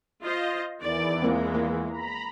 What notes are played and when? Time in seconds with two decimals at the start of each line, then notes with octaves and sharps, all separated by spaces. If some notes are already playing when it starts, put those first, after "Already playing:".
0.22 F4 C5 D#5
0.81 E2 D#3 E3 D5
1.22 G#3 A#3 C4
1.54 A#3
1.89 A#5 B5